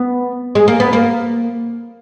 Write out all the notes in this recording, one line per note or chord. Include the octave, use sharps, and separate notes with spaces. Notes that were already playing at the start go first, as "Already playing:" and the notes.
Already playing: B3
G#3
A#3
B3
A#3